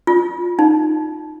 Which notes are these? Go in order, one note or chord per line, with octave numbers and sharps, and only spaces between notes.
F4
D#4